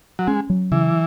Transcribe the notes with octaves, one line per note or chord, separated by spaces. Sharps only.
F#3
G#3 C#4
F#3
C#3 E3